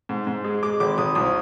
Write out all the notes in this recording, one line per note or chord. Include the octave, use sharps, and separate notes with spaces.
G#2
G#2
G#3
G#3 D6
G#1 D6
G#1 D#6
C2 D#6